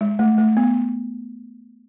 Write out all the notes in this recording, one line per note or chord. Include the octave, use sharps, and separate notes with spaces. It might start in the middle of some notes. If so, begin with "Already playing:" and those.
G#3
A3
A3
B3